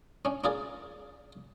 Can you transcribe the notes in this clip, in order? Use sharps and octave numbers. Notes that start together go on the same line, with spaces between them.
C#4 D4
D4 F4 G#4 A#4 D5